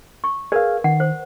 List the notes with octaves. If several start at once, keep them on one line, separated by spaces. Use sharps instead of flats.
C#6
G#4 A#4 B4 D5 F5
D#3 F#5
C5